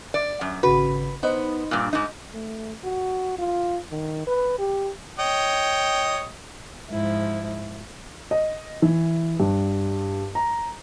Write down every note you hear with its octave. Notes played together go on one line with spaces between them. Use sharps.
D5
F#2
G#1 C#3 F#4 B4
B3 D#4 C5 D#5
G2 A#2
G#2 D#4 D#5
A3
F#4
F4
D#3
B4
G4
C#5 D#5 G5
G#2 F3 E4
D#5
E3
G2
A#5